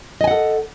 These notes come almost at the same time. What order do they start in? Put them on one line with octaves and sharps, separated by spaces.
D#5 G#5 F#5 A4